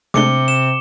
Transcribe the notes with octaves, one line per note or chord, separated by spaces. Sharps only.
C3 G#3 A3 D4 D6 C#7 G7
C3 E7